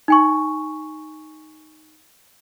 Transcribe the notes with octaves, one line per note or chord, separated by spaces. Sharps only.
D#4 G#5 C#6